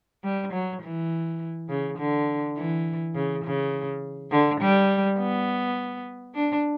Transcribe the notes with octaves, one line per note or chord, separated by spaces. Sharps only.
G3
F#3
E3
C#3
D3
E3
C#3
C#3
D3
G3
B3
D4